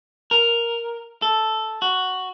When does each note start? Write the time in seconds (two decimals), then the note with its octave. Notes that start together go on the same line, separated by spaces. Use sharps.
0.31 A#4
1.22 A4
1.82 F#4